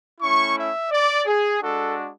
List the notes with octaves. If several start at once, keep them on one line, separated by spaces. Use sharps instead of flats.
A3 C#4 E4 C#6
E5
D5
G#4
G#3 D4 F#4 A4